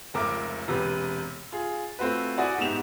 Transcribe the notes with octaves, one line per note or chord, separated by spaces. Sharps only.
F1 C#2 A#4 E5 D6
E1 C3 G4 B4
F4 G#4
A3 C4 F4 F#4 B4
E4 F#4 D5 F#5 G#5 D#6
G#2 B3 G4 E7 F7